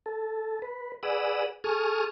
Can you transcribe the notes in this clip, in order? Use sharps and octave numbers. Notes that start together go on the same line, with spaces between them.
A4
B4
G#4 B4 D5 F#5 D#6 E6
G#4 A4 C#6 D#6 F6